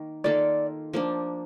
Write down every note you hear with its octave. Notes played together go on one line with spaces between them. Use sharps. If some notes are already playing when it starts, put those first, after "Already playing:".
Already playing: D#3 A#3
D#3 A#3 F4 A4 D5
F3 A#3 D4